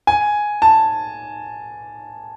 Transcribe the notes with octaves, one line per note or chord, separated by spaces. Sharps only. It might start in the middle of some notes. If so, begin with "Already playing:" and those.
G#5
A5